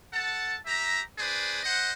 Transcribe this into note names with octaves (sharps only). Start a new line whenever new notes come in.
A4 F#5 A5
G4 E5 A#5
D4 G#4 B4 C5 D5
C5 D#5 F#5